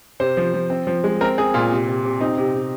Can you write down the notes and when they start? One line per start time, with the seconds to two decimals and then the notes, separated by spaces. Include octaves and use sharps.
0.20 C3 C5
0.37 F3
0.54 F3
0.70 C4
0.87 F3
1.04 G#3
1.21 C4 A#4
1.38 C4 G#4
1.54 A#2 F4
1.71 C3
1.88 C3
2.05 C3
2.20 C4 D#4
2.38 C3
2.55 C3